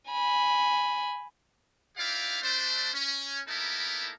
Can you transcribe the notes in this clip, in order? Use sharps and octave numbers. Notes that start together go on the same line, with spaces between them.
G#5 B5
D#4 E4 G4 D5 F5
A3 D4 C5
C#4
A#3 B3 D#4 E4 A4 A#4